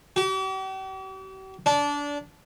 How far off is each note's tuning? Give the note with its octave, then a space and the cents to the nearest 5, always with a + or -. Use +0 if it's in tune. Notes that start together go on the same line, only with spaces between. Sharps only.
G4 -45
D4 -20